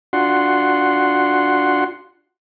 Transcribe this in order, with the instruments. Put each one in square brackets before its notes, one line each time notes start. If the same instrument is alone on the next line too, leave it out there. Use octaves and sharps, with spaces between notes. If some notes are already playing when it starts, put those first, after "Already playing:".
[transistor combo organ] D4 F4 F#4 F#5 C6